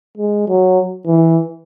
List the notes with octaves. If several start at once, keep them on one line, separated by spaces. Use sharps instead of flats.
G#3
F#3
E3